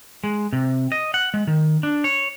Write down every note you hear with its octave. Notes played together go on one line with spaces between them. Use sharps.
G#3
C3
D#5
F#5
G#3
D#3
D4
C#5